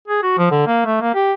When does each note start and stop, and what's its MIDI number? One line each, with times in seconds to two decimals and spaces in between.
0.08 0.23 68
0.23 0.36 66
0.38 0.47 53
0.51 0.63 50
0.67 0.83 58
0.85 0.97 57
1.01 1.13 58
1.14 1.33 67